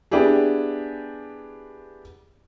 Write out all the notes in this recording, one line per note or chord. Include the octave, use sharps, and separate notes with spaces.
B3 D4 E4 G4 G#4